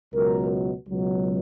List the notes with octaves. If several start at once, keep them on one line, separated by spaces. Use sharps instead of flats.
C#2 B2 F#3 A#4
C#2 B2 F#3